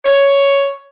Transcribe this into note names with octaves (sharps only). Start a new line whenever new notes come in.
C#5